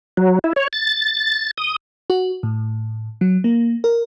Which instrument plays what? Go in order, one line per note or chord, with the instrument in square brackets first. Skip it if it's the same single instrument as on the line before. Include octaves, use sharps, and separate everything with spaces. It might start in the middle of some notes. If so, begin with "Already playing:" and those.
[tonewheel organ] F#3
E4
C#5
A6
D#6
[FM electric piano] F#4
A2
F#3
A#3
A#4